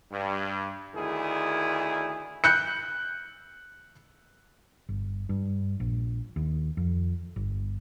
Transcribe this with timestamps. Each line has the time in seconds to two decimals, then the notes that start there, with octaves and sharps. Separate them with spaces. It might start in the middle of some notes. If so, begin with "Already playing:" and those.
0.12 G2
0.95 D2 D#3 E4 G#4
2.44 F#6 G6 C#7
4.89 G1
5.29 G2
5.80 A#1
6.36 D#2
6.77 F2
7.36 G1